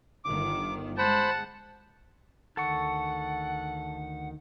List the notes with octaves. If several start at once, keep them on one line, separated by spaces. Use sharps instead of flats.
G1 D#3 D6
G#3 C5 F#5 A5 B5
D2 D#3 A4 F#5 C#6